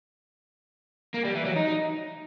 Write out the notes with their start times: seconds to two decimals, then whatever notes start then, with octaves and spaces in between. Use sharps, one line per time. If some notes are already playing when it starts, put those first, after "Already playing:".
1.14 A#3
1.25 G3
1.35 E3
1.46 F#3
1.56 D#4